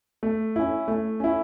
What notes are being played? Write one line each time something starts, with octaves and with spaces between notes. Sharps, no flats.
A3
C#4 E4
A3
C#4 E4